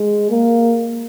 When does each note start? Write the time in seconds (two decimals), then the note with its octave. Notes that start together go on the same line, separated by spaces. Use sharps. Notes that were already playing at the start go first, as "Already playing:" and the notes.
Already playing: G#3
0.31 A#3